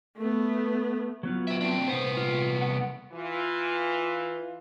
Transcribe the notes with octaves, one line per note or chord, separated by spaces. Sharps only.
A3 B3
F#3 B3 F4
C5 E5
C4 D4
C2 B3 C5
F4
F#5
E3 F4